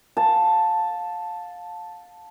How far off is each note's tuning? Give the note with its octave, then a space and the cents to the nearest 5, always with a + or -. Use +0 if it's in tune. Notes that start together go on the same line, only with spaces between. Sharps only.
F5 +25 A5 +0